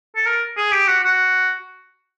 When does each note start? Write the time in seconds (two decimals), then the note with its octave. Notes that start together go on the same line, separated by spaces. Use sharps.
0.16 A4
0.26 A#4
0.57 G#4
0.72 G4
0.87 F#4
1.03 F#4